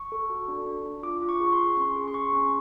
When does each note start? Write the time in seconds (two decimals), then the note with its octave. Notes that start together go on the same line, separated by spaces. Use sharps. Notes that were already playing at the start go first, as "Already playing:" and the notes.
Already playing: C#6
0.12 A4
0.30 F#4
0.48 D4
0.67 D4
0.85 D4
1.03 F4 D6
1.22 F4
1.29 C#6
1.40 G#4
1.47 C#6
1.53 C6
1.59 G#4
1.77 C#4 C6
1.96 G#4
2.08 C6
2.13 G#4 C#6
2.33 C#4